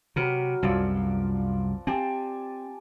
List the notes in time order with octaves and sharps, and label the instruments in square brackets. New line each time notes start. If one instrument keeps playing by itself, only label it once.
[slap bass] C3 [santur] F#3 A#4 B4
[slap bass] C2 F#2 [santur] F3 D5 E6
[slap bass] C4 [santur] G4 G#5 A5